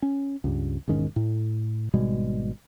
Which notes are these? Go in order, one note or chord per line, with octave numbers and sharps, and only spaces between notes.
C#4
C#2 G2
E1 G#2 D#3 C#4
A2
G#1 B2 G3 G#3